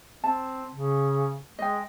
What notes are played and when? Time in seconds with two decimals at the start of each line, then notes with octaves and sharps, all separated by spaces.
0.24 C4 A5
0.72 C#3
1.59 G#3 D#5 G5